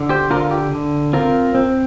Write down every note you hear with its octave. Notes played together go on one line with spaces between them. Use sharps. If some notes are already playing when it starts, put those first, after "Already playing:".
Already playing: D3
G4 C5
D3 F4 A#4
G4
D3
C4 F4 A#4
C4